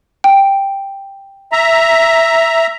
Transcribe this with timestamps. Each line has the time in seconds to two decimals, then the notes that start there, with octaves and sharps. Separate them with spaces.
0.24 G5
1.52 E5 A#5